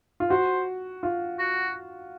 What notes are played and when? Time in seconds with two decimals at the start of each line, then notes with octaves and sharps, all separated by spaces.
0.20 F4
0.30 F#4 C5
1.03 F4
1.39 F#4